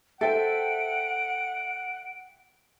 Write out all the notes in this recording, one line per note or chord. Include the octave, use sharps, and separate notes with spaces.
A4 C5 E5 F#5 G5 D7